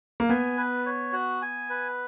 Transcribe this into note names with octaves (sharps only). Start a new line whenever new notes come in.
A#3
B3 G#5
B4
C#5
F#4
G#5
B4